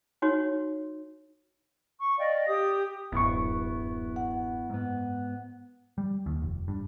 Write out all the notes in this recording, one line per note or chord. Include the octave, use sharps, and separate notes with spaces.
D#4 F#4 C#5
C#6
D5 D#5 F5 G5
G4 D#6
D1 F#2 B3 E4 C#6
F#5
G#2 B3
G3
D#2
F1
G2